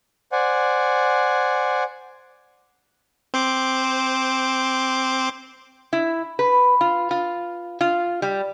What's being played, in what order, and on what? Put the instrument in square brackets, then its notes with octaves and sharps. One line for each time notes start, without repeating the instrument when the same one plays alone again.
[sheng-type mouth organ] C5 D5 F#5 G#5
[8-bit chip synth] C4 C5 D6
[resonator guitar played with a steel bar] E4
B4
F4
F4
F4
G3